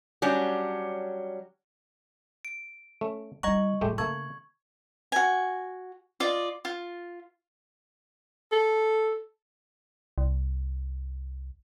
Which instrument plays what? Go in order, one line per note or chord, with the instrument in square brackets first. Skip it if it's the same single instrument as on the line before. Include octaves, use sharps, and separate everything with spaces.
[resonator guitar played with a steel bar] F#3 G3 C#4 D4
[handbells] D7
[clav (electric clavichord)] A3 C#4
[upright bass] G3 E4 [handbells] D#5 C#6 [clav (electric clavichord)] F#5 A#5
[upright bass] A2 F#3 [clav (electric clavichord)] G#3 A3 G4
[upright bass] C#3 [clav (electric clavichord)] A3 A#3 A4 [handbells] C#6 G#6
[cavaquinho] F#4 G#5
F4 D5 D#5
F4
[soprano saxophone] A4
[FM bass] C2